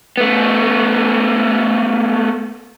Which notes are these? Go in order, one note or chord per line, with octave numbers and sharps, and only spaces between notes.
A3 B3